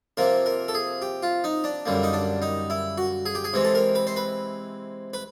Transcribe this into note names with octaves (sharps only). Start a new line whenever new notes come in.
C3 F3 A#3 A#4
A#4
A4
G#4
G4
F4
D#4
D4
F#2 D3 G3 A#3
D#4
D4
D#4
E4
F#4
G#4
G4
G#4
C3 E3 G#3 C4
A4
A#4
B4
C5
B4
B4